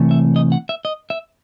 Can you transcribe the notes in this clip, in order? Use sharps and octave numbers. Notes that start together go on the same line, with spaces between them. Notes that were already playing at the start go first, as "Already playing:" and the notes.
Already playing: C3 E3 A3
E5
D#5
F#5
E5
D#5
E5